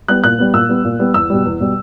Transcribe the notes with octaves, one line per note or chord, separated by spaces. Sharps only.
G3 B3 F#6
A#2 F#6
G3 B3
A#2 E6
G3 B3
A#2
G3 B3
E2 E6
B2 G3
E2
B2 G3